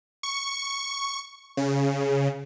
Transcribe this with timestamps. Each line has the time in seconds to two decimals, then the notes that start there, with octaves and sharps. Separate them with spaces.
0.23 C#6
1.57 C#3